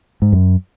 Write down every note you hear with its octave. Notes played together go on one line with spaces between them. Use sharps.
G#2
F#2